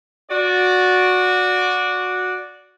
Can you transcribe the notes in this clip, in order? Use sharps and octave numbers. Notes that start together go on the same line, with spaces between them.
F#4 D5